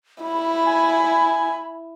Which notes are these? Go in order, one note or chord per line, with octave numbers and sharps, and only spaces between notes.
E4 B5
G#5